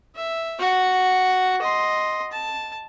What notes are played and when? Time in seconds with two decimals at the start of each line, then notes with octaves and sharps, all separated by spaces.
0.16 E5
0.60 F#4 F#5
1.62 D#5 C6
2.32 A5